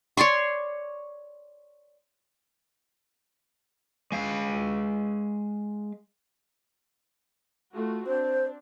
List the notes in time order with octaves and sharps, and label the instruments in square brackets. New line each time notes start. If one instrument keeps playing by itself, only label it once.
[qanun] C#5 D5 C6 C#6
[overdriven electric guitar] G#3 F5
[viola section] A3 F4 F#4
[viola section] C4 D4 [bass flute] C5